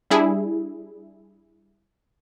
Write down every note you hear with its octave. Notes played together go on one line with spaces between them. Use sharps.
G3 D4 E4 G#4